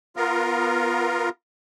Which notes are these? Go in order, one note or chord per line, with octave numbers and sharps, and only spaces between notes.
B3 F4 A#4